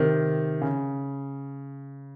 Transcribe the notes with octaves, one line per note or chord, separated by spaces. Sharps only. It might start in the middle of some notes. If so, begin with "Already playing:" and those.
Already playing: C3 D#3
C#3